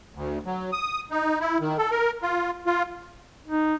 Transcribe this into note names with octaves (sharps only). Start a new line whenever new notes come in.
D2
F#3
D#6
D#4
E4
D#3
A4
A#4
F4
F4
D#4